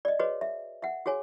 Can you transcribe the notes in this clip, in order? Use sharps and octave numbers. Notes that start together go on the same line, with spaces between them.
D5 D#5
F#4 G#4 B4 C#5 D#5
E5
E5 F#5
F#4 G#4 C#5 G#5